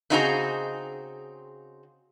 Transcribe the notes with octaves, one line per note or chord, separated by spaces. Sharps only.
C#3 C4 D#4 F#4 G#4 A#5